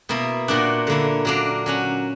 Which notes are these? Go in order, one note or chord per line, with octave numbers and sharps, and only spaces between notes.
B2 A#3 E4
A#2 A#3 D4 F#4
D3 A#3 E4
F#3 A#3 D4
F#3 C#4 F#4